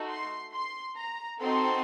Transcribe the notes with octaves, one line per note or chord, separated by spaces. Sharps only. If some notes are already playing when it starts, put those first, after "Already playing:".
Already playing: A3 D#4 F#4 A4
C6
C6
A#5
C4 D#4 F#4 A4 C6